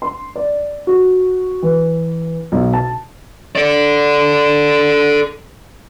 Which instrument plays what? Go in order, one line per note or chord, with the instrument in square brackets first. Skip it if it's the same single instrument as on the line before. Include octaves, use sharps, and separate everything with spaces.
[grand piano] C6
D5
F#4
E3
B1
A5
[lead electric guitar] A4 D5